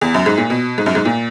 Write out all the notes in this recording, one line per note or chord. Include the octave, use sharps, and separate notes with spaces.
E2
F#2
G#2
A#2
B2
G#2
F#2
G#2
A#2